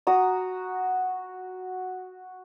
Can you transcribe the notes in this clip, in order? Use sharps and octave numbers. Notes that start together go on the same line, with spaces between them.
F#4 A#5 D#6